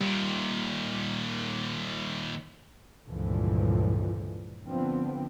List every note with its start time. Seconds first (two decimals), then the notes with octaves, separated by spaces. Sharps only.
0.01 D#2 A#2 G3
3.07 C#2 G2 A#2 D3 E3 F3
4.65 D3 F3 B3 C4